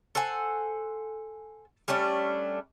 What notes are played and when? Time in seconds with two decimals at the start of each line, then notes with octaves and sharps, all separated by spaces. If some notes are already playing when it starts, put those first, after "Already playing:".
0.15 A4 C5 F#5 G#5
1.88 G3 A3 C#4 D4